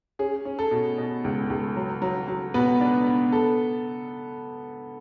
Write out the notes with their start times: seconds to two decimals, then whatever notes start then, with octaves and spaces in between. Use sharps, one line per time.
0.19 C#4 G#4
0.45 C#4
0.59 A4
0.71 B2
0.98 B2
1.24 C#2
1.50 C#2
1.76 F#3
2.02 F#3
2.28 F#3
2.54 B2 B3 B4
2.81 D4
3.07 B3
3.32 A4